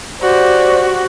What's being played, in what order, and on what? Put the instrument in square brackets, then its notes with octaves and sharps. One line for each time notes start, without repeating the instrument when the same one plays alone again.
[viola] F#4 G4 [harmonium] C5 D5